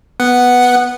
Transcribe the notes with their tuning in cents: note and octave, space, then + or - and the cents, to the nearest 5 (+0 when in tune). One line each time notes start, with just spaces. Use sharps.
B3 +0 F#5 +0